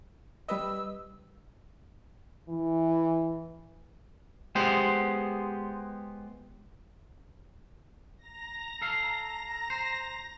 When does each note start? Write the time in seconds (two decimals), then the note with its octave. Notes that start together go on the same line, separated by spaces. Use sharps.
0.49 G3 B4 D#5 E6
2.49 E3
4.55 G#3 B3 G4 C5
8.17 A#5 A#6
8.82 A4 F5
9.70 C5